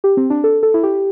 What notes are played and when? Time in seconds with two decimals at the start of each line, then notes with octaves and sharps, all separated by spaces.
0.04 G4
0.17 C4
0.30 D4
0.44 A4
0.63 A4
0.74 E4
0.83 G4